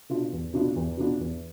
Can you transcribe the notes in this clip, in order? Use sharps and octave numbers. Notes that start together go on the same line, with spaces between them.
B2 B3 D4 F4
E2
B2 B3 D4 F4
E2
B2 B3 D4 F4
E2